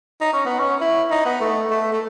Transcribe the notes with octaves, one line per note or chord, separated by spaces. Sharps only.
D#4
C#4
B3
C#4
E4
D#4
B3
A3
A3
A3